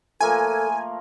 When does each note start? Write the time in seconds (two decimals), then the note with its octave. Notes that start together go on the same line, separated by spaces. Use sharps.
0.21 F3 A3 A#3 A4 G#5